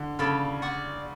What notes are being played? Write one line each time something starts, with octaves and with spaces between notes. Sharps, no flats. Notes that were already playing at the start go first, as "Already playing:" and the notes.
Already playing: D3
C#3 A4 D5 F5 B5
D5 F#5 C#6